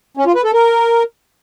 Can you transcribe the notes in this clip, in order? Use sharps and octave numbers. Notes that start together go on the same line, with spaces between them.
C#4
F4
B4
A4
A#4